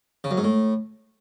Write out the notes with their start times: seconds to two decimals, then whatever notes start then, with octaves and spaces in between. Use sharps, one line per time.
0.24 C#3
0.31 F#2
0.37 G#2
0.44 A2